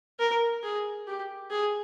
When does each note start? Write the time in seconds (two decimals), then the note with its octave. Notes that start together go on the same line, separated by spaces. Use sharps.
0.19 A#4
0.63 G#4
1.07 G4
1.51 G#4